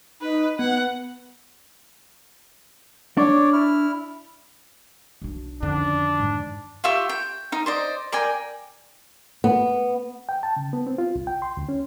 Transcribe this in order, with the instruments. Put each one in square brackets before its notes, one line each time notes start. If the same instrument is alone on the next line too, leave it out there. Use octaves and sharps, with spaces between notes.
[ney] D#4 [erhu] B4
[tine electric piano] B3 [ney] B4 [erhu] F#5
[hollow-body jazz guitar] D4 [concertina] C#5 D5
[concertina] E4 F6
[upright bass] B1 D4
[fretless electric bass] F2 D3 D#3 [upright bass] C#4 [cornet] D4
[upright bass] G#2
[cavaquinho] F4 G4 E5 C#6
G5
D#4
C5 D5 D#5
A#4 D5 G5 G#5
[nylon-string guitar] B3
[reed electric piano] G5
A5
C#3
B3
C4
F4
C2
G5
C6
D2
C#4